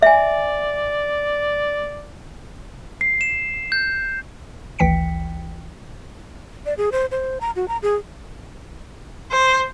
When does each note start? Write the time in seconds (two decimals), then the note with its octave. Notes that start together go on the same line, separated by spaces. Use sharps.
0.02 D5 E5 G#5
3.01 C7
3.21 E7
3.72 G6
4.79 G#1 D2 E3 G5 B6 C#7
6.66 D5
6.78 G#4
6.92 C5
7.11 C5
7.41 A#5
7.56 F#4
7.68 A#5
7.82 G#4
9.31 C5